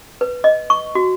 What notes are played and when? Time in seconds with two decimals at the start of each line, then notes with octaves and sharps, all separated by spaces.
0.21 B4
0.44 D#5
0.70 C#6
0.95 F#4